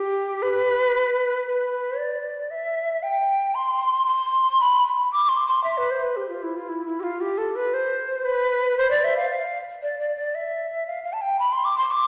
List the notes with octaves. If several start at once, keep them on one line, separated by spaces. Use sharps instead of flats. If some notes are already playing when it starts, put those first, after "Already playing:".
Already playing: G4
B4
B4
D5
E5
G5
C6
C6
B5
D6
C6
C6
E5
B4
C5
B4
G4
F4
E4
F4
E4
E4
G4
F4
G4
A4
B4
C5
B4
C5
D5
E5
F5
F5
D5
D5
D5
E5
F5
F5
A5
G5
B5
C6
D6
C6
D6